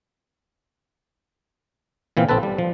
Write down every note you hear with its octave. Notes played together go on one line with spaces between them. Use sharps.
A#2 E3 C4 F4
A#1 C4 A4 B4 A5
G3
F3